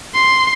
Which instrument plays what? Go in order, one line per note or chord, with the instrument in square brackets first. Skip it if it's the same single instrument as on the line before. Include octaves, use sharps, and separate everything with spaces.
[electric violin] C6